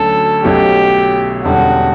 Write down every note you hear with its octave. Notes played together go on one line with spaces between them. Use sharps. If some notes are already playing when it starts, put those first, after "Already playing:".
Already playing: D2 D3 F#3 C#4 A4
B1 B2 F#3 A3 C#4 G4
E1 E2 D3 G3 C#4 F#4